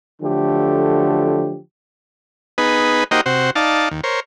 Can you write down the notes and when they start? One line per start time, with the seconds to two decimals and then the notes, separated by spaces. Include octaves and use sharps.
0.21 D3 F3 F#3 A3 G4
2.58 B3 D#4 G#4 B4
3.11 A#3 D#4 F#4 G4 C5 D#5
3.26 C3 F#4 C5
3.55 D#4 D5 F5 A5
3.91 D#2
4.04 A#4 C5 C#5